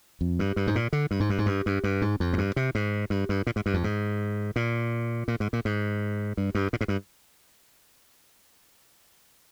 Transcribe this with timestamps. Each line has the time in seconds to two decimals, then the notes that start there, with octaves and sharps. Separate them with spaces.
0.21 F2
0.39 G2
0.56 G2
0.67 G#2
0.75 A#2
0.93 D3
1.11 G2
1.20 G#2
1.30 G2
1.38 G#2
1.46 G2
1.66 G2
1.84 G2
2.02 G#2
2.20 F2
2.33 G#2
2.38 G2
2.56 C3
2.75 G#2
3.10 G2
3.29 G2
3.47 A#2
3.56 G#2
3.66 G2
3.74 F2
3.84 G#2
4.56 A#2
5.28 A#2
5.40 G#2
5.53 A#2
5.65 G#2
6.37 G2
6.55 G2
6.73 A#2
6.81 G#2
6.88 G2